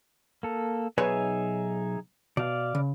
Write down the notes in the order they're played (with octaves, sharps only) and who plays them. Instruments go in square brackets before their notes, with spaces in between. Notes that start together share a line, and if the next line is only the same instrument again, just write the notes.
[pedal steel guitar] A#3 A4
[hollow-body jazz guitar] B1 B4 C#5 [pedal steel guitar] D#4 G#4 E5
[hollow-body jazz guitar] B2 [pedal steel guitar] D5 F5
[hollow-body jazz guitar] C#3